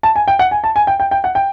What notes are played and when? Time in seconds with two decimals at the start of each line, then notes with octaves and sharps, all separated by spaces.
0.03 A5
0.16 G#5
0.28 G5
0.39 F#5
0.51 G#5
0.64 A5
0.76 G#5
0.87 G5
1.00 G5
1.11 G5
1.24 F#5
1.35 G5